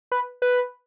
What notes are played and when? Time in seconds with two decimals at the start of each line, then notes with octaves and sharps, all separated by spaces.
0.12 B4
0.42 B4